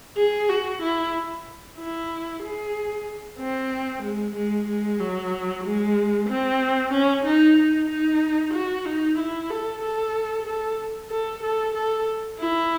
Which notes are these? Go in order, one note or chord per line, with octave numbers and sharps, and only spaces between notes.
G#4
F#4
E4
E4
G#4
C4
G#3
G#3
G#3
F#3
G#3
C4
C#4
D#4
D#4
D#4
F#4
D#4
E4
A4
A4
A4
A4
A4
A4
E4